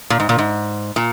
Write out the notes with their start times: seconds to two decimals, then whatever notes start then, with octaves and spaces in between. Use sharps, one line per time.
0.10 A#2
0.20 G#2
0.29 A#2
0.38 G#2
0.96 A#2